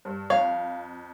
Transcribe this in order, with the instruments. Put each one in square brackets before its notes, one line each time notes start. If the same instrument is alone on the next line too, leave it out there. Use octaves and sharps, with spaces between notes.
[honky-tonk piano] G2
[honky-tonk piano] F2 [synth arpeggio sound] C#5 [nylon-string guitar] F5